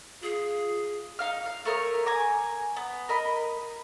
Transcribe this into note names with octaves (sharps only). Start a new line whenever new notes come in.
F4 G#4
D#4 F5 F6
F5
A3 A#4 C#5 D#6
G#5 A#5 D6
B3
A#4 D#5 B5